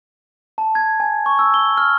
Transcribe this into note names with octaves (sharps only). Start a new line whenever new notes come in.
A5
G#6
G#5
C#6
E6
G7
F6